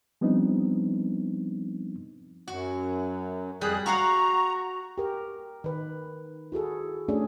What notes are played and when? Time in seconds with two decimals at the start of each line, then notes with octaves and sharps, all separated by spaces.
0.21 F3 G3 B3 C4 D4 D#4
2.48 F#2 F#4
3.61 F2 G3 G#4 F#6
3.86 F#4 F5 F#5 A#5 C#6
4.98 G4 A#4
5.64 D#3 B4
6.52 E4 F#4 G#4 A4
7.08 A3 C#4 D4 G#4